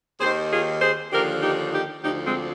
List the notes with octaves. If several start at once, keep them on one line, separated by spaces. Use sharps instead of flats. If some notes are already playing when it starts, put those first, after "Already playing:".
D#2 D#3 G#4 C5
F4 G#4
G#4 C5
D#2 D3 F3 G4 A#4
D#4 G4
D#4 G4
D2 D3 F3 D#4 G4
G#3 C4